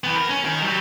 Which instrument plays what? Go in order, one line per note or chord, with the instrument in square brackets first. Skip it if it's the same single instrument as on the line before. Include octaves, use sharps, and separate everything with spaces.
[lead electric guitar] E3 B3
A#4
C#4
D#3 A#4
F#3 G3